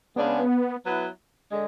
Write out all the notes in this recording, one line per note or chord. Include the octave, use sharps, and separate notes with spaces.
C#3 G#3 B3 D4
F#3 B3 E4
D3 G#3